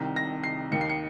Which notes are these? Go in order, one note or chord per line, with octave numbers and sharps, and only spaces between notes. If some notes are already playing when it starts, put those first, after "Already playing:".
Already playing: C2 C3 D#3
A#6
C7
D#2 D#3 C#7
C7
C#7